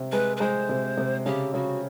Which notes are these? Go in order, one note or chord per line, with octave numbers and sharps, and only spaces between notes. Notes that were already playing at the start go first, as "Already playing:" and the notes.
Already playing: C3
G#3 B4
B4
G#3 C5
C3
C3
C#3 G4
C#3 F#4